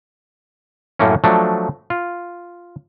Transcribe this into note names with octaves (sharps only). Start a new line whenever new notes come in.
F#2 A2 A3 A#3 C#4
F3 F#3 A3 D4
F4